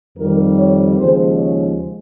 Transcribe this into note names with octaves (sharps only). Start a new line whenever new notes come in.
F2 D#3 G3 A#4
C#5
D#2 C#3 F3 G#3 C5
C#5